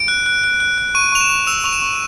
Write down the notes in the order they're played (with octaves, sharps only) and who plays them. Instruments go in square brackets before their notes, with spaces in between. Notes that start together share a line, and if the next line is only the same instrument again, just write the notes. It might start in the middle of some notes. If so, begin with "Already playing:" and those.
Already playing: [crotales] D7
F#6
F#6
F#6
F#6
F#6
C#6 D#7
C#6 F7
E7
C#6
E6 F7
C#6 F7
E7
C#6